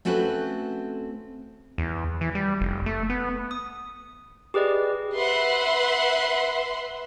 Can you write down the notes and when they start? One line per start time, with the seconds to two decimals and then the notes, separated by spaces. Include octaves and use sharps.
0.05 A3 C4 C#4 F#4 A4 B4
1.78 E2
2.21 E3
2.35 G3
2.61 F1
2.86 A3
3.10 B3
3.51 D#6
4.54 G4 G#4 B4 D5 D#5
5.15 B4 E5 F#5 C6